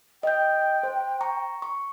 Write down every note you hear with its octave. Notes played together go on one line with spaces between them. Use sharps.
D#5 G5 G6
C5
A#5 C#6
C#6